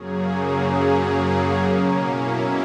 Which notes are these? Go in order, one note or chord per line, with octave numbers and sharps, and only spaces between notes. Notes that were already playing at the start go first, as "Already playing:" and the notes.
Already playing: F#2 C#3 F#3 A#3 C#4 G#4
G#4
B2 A#3 C#4
E4